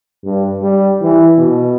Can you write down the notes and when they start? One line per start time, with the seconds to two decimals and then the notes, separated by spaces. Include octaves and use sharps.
0.25 G2
0.62 G3
1.02 E3
1.38 B2